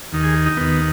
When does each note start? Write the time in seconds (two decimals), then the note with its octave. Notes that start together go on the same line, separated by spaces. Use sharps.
0.12 D#2 D#3
0.23 G#4
0.46 D#4
0.57 D#2 D#3 B3